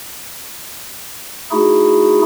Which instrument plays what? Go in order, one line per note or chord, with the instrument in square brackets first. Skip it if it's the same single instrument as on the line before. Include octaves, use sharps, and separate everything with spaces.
[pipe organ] A3 D#4 E4 F#4 G#4